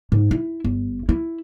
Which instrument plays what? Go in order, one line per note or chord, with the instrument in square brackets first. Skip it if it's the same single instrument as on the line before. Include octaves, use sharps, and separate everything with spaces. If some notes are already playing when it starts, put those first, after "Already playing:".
[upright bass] G#2
E4
G1
E4